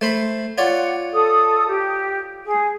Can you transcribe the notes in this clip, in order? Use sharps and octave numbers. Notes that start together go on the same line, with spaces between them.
A3 C5 B5
F4 C#5 D5 F#5
A4 D#6
G4
G#4